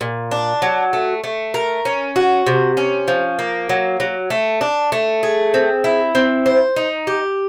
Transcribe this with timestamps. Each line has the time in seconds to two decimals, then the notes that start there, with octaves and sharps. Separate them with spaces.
0.01 A#2
0.31 D4
0.62 F#3
0.93 A3
1.24 A3
1.54 A#4
1.85 C#4
2.16 F#4
2.47 C3
2.77 C#4
3.08 F3
3.39 A#3
3.69 F#3
4.00 F#3
4.30 A3
4.61 D4
4.92 A3
5.23 G#4
5.54 C4
5.84 E4
6.15 C4
6.46 C5
6.76 D#4
7.07 G4